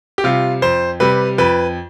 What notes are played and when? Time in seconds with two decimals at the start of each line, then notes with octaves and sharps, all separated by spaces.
0.18 G4
0.24 C3 G3 F4
0.62 F2 C5
1.00 C3 G3 B4
1.38 F2 B4